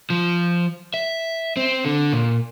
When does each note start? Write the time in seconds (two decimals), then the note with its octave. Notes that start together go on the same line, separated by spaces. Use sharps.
0.10 F3
0.94 E5
1.57 C4
1.85 D3
2.13 A#2